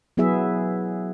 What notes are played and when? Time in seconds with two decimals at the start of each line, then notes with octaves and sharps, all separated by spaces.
0.17 F#3 B3 E4 G#4 E5